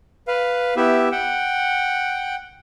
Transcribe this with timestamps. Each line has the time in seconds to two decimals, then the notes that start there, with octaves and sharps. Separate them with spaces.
0.28 B4 F5
0.76 B3 E4 G4 E5
1.12 F#5 G5